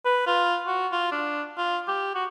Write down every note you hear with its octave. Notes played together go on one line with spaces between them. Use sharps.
B4
F4
F#4
F4
D4
F4
G4
F#4